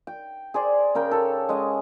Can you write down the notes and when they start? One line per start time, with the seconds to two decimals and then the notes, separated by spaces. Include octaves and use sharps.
0.07 G5
0.54 G#4 C5 D5
0.95 C#3 A#4 G5
1.11 A4 C#5
1.49 G#3 C#4 D#5